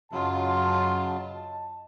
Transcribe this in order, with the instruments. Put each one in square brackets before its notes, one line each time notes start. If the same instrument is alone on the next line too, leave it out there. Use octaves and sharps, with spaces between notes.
[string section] F#2 F4 [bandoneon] C#3 F#3 [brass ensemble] D#5 A5